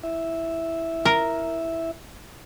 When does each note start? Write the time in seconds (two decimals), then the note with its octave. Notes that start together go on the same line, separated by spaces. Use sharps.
0.03 E4 E5
1.05 A#4